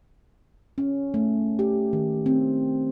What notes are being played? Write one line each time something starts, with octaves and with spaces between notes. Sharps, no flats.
C#4
A3
G4
D#3
C4